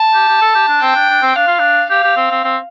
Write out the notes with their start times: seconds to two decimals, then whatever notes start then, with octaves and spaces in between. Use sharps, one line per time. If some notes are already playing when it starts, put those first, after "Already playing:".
Already playing: A5
0.14 G4
0.28 G4
0.41 A4
0.55 G4
0.68 D4
0.82 C4 G5
0.95 D4
1.09 D4
1.22 C4
1.36 D4 F5
1.47 F4
1.59 D4
1.90 G4 F5
2.03 G4
2.17 C4
2.30 C4
2.44 C4